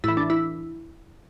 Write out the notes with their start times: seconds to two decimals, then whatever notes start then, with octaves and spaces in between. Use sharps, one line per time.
0.04 A2 E3 E4
0.17 D4
0.30 E4